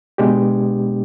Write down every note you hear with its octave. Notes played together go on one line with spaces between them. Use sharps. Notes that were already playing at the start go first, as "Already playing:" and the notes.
B2 G#3 B3 D4 G4